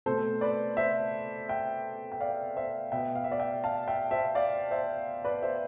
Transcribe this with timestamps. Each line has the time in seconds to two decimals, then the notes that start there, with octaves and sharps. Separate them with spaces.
0.06 B2 A3 C4 A4 C5
0.41 B4 D5
0.77 C5 E5
1.49 E5 G5
2.12 G5
2.21 D5 F5
2.56 C5 E5
2.92 B2 B3 E5 G5
3.15 F5
3.24 E5
3.32 D5 F5
3.39 E5 G5
3.64 F5 A5
3.87 E5 G5
4.11 C5 E5
4.35 D5 F5
4.71 C5 E5
5.25 B4 D5
5.42 C5 E5